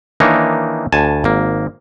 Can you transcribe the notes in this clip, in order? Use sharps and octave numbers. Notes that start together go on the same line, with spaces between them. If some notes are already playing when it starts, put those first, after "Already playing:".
D#3 E3 A#3 D4 D#4 C#5
D2 G#5 A5
G#1 A#3